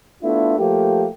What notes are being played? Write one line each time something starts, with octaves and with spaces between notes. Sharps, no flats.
A3 B3 D4 E4 F4
F3 A3 A#3 G4